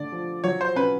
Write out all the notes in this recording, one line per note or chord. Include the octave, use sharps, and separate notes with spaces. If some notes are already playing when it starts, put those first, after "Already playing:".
Already playing: D3 A3 D5
F3
F#3 C#5
C5
C#4 B4